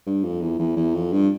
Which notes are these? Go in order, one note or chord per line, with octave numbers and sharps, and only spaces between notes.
G2
F2
E2
E2
E2
F2
G2